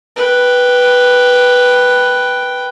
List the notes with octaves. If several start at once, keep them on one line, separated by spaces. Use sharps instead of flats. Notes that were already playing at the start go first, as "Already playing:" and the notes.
B4 G5